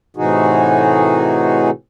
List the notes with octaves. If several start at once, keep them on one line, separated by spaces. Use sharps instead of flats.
A2 C3 E3 D#4 F#4 G#4